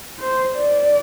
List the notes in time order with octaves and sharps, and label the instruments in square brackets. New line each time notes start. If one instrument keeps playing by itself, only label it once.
[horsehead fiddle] C5
D5